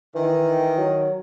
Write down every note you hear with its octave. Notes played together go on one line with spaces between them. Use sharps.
D#3 E3
F#3